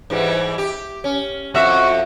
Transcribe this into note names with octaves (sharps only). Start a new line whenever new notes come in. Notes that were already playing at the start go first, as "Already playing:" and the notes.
G#2 E3 G3
G4
C#4
F2 F#4 E5